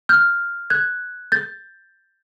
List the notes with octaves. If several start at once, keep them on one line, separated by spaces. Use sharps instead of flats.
F6 G6
F#6 G#6
G6 A6